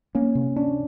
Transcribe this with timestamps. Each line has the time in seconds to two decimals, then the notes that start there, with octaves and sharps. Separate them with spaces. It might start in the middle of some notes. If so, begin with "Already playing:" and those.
0.15 A#3 C#4
0.35 C3
0.56 C#4 D4